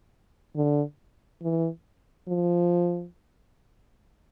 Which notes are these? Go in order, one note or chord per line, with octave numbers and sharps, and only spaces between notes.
D3
E3
F3